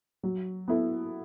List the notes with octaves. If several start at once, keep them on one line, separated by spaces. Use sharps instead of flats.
F#3
B3 E4 A4